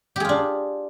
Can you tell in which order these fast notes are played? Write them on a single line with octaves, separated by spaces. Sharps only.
G4 G#4 F4 D4